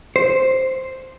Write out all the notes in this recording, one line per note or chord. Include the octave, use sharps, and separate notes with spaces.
C5